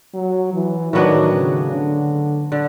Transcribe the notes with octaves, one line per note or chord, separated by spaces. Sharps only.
F#3
E3
A2 D#3 F#3 B3 D4
C#3
D3
D3